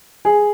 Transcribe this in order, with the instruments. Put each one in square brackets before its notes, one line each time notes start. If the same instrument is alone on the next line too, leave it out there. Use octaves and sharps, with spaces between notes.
[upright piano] G#4